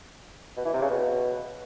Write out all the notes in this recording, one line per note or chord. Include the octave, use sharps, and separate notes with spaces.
B2
E3
C3
C#3
B2